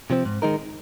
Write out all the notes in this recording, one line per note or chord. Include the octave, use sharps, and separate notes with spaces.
C3 F3 C4
G#2
D#3 G#3 D#4 A#4